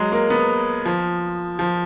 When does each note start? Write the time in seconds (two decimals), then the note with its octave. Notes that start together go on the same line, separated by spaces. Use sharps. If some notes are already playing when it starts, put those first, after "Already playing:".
Already playing: F#3 G#3
0.12 A#3
0.30 B3
0.85 F3
1.59 F3